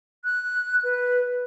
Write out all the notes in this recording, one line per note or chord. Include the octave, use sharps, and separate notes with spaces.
F#6
B4